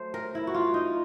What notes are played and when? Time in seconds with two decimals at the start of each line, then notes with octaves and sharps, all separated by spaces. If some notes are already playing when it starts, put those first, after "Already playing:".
Already playing: F#3 A3 C5
0.14 A#4
0.35 E4
0.47 F#4
0.54 F4
0.74 D#4